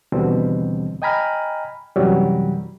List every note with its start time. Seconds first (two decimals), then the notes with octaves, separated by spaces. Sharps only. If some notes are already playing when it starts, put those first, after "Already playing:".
0.12 D#2 B2 D3 E3 G3 C4
1.02 D#5 G5 G#5 A#5 B5 F6
1.96 F#2 C3 E3 F#3 G3